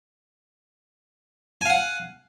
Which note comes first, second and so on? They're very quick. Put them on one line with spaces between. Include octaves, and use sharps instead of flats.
G#5 F5 F#5